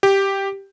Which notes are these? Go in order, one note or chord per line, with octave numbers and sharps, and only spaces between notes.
G4